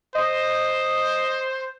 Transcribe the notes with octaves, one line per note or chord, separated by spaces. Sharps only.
C5 D#5